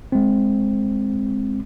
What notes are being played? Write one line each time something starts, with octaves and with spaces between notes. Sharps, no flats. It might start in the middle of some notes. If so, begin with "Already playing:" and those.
G#3 C4